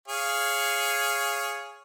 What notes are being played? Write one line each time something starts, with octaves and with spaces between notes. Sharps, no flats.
G#4 C#5 F5